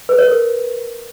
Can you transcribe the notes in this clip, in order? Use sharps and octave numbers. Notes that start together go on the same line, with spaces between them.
B4
C#5
A#4